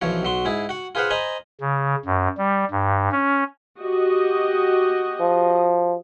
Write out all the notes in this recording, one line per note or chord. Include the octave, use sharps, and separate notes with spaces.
B1 E3 F3 C#5
B1 F#3 C6
G#2 E4 G#4
F#4 F#5
F4 G#4 B4 C5 F5 F#5
C5 D#5 G#5 A#5 B5
C#3
F#2
G3
G2
C#4
F#4 G4 D#5
F3